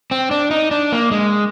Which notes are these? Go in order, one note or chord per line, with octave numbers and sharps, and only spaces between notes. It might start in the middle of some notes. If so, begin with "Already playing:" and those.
C4
D4
D#4
D4
A#3
G#3